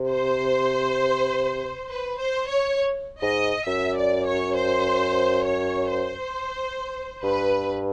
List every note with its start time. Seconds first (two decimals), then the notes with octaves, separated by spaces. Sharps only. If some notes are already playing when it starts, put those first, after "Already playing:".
Already playing: C3
0.10 C5
1.89 B4
2.19 C5
2.48 C#5
3.22 G#2 D#5
3.67 F#2 E5
3.97 D5
4.27 C#5
4.56 C5
5.46 C#5
5.90 C5
7.23 G2 B4